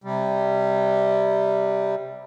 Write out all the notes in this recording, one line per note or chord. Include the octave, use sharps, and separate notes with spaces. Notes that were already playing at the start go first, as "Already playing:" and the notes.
C3 G3